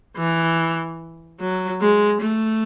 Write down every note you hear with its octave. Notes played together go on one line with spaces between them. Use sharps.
E3
F#3
G#3
A3